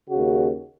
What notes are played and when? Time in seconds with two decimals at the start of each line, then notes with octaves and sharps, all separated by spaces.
0.09 C#3 F#4
0.15 D#2